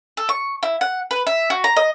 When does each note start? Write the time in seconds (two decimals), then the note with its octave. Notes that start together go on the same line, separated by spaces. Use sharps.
0.17 A4
0.29 C#6
0.63 E4
0.81 F#5
1.11 B4
1.27 E5
1.50 F#4
1.64 A#5
1.77 D#5